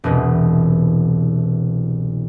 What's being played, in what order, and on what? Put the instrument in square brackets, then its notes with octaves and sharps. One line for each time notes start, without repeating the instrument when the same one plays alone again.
[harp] E1 C2 B2 E3